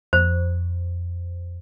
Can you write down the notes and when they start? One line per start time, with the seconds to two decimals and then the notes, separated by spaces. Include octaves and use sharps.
0.13 F2 C5